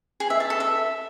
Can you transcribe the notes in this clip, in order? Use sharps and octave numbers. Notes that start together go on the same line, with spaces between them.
G#4
E5
A5
A4
E5